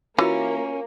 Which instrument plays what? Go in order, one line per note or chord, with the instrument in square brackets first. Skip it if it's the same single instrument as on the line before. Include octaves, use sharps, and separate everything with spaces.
[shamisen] E3 [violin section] A#3 [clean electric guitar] C#4 [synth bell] F4 F#4 E5